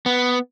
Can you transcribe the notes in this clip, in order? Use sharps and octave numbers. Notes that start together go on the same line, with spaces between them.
B3